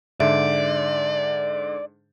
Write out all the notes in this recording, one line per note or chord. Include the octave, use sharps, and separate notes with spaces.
G#2 D3 D5 E5